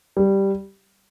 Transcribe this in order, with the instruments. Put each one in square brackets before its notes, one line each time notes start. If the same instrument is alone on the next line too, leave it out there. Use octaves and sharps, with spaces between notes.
[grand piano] G3